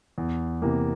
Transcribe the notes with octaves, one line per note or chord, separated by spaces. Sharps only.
E2
C3 E3 A#3